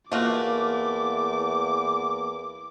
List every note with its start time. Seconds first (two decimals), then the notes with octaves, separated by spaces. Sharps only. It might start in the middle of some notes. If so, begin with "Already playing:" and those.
0.12 E2 A3 A#3 F4 F#4 F5 D6